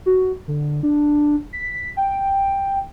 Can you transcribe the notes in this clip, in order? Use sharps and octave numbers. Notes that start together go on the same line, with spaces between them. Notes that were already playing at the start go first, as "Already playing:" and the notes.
F#4
D3
D4
B6
G5